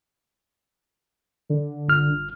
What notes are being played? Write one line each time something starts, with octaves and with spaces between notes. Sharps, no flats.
D3
G1 F6